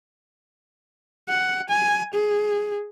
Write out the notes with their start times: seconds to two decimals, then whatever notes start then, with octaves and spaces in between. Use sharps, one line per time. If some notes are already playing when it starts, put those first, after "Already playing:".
1.29 F#5
1.70 G#5
2.14 G#4